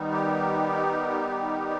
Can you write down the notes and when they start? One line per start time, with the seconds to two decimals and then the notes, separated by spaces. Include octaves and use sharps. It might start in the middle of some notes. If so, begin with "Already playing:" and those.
Already playing: D#3 G3 B3 D#4
0.12 G4